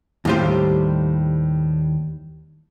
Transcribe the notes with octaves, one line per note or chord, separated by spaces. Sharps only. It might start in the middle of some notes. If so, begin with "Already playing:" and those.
D#2 A2 G3 F4 G4 C5